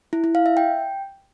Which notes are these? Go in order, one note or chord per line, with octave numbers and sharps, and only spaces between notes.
E4
E4
F5
E5
G5